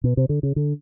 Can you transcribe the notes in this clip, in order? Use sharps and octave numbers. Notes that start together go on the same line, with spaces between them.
B2
C3
D3
C#3
D3